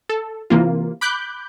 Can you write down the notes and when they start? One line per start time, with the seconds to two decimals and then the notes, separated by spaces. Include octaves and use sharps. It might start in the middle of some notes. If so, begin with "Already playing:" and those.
0.09 A4
0.50 C3 E3 A#3 F4
1.01 B5 D6 F#6 G6